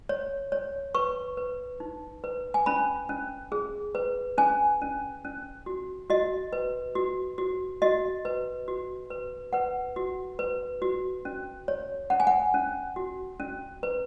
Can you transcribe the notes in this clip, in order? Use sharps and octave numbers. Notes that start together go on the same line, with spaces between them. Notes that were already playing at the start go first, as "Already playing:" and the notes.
C#5
C#5
B4 C#6
B4
D#4
B4
G#5
C#4 B5
C#4
G#4
B4
C#4 G#5
C#4
C#4
F#4
F#4 D#5
B4
F#4
F#4
F#4 D#5
B4
F#4
B4
B4 F#5
F#4
B4
F#4
C#4
C#5
C#4 F#5
G#5
F#5
C#4
F#4
C#4
B4